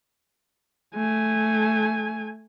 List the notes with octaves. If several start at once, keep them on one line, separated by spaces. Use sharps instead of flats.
A3 G#5